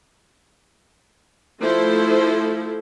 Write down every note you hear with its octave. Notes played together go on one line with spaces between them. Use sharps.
F3 A3 E4 A4 C5